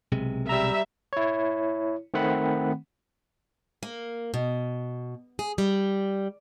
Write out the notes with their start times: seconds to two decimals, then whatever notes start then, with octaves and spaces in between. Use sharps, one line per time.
0.12 B1 C3 G#3
0.49 G3 E5 A#5
1.13 E4 C#5
2.14 D#3 A3 C4 F#5 B5
3.83 A#3
4.34 B2
5.39 G#4
5.58 G3